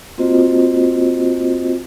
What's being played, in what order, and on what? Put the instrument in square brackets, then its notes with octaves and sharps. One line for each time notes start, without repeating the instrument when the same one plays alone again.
[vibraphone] A#3 C4 F4 F#4 C5 D#5